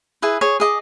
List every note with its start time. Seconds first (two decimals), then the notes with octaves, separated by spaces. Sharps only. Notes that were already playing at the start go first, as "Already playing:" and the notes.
0.22 E4 G#4 B4
0.41 G#4 C#5
0.60 G#4 D#5 D6